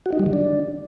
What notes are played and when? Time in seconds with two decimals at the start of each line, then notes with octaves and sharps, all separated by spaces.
0.06 F#4
0.13 D#4
0.19 G3
0.26 D#3
0.33 D4